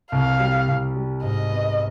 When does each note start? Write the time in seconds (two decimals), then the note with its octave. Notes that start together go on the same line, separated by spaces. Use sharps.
0.12 C2 F5
0.40 G3
0.68 C2
0.96 G3
1.23 G#2 D#5
1.51 B3